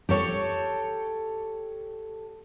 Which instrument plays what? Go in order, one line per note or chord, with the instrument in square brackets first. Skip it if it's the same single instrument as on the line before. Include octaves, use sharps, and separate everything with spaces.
[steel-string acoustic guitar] G4 A4 C#5